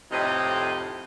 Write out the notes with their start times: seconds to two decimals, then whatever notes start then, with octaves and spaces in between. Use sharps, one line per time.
0.12 F2 A2 C3 C4 D#4 D#5